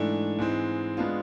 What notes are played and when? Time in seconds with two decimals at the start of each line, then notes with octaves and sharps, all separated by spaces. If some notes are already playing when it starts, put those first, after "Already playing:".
Already playing: G#2 E3 A3 D4
0.39 G#2 E3 G#3 C4
0.97 G#3 B3 D4 F4